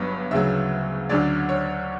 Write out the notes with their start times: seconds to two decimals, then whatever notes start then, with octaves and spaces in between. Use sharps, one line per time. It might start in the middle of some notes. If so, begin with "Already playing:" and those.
Already playing: G1 G2 F#3 B3 B4 C#5
0.31 D2 C#3 F#3 E5
1.09 D2 D3 F#3 C#4 D5
1.49 C#5